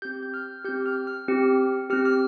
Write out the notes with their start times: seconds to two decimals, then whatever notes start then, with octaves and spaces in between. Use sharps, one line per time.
0.02 C4 G4 G6
0.23 G6
0.34 F6
0.65 C4 G4 G6
0.86 F6
1.07 F6
1.28 C4 G4
1.90 C4 G4 F6
2.05 F6